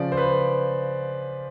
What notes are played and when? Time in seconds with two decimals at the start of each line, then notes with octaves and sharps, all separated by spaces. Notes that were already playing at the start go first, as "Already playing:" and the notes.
Already playing: C#3 F3 D5
0.12 C5
0.17 B4